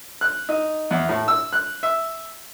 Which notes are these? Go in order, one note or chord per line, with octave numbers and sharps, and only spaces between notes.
F#6
D#4
E2
A2
E6
F#6
E5